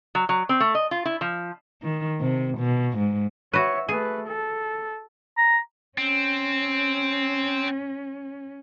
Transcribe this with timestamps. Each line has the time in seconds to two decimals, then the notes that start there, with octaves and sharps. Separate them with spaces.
0.15 F#3
0.29 F#3
0.49 C4
0.60 A3
0.75 D#5
0.91 F4
1.05 E4
1.21 F3
1.83 D#3
2.21 C3
2.58 B2
2.98 G#2
3.53 F#4 B4 C#5 E5
3.89 A3 G#4 B4
4.27 A4
5.37 A#5
5.98 C4 C#4